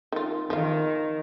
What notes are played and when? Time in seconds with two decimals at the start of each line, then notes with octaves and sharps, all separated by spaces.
0.12 D#3 F4
0.50 D#3 F3 F5